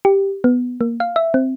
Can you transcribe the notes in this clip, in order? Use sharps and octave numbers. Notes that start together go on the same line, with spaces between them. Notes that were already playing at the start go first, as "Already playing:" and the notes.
G4
B3
A#3
F5
E5
C4